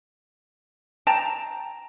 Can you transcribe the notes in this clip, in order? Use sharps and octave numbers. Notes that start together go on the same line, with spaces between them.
G5 A5 A#5